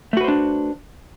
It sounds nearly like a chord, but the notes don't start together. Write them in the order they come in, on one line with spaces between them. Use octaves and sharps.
A3 F#4 B4 C5 D4